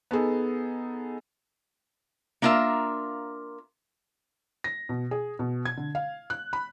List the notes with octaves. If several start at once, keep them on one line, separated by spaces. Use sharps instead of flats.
B3 D#4 G#4 A4
A#3 D4 F4 A#4 E5
A#6
B2
G#4
B2
G#6
D3
F5
F#6
B5